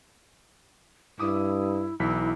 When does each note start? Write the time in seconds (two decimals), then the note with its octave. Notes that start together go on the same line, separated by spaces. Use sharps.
1.19 G2 E4 D6 D#6
2.00 B1 E3 E4 B6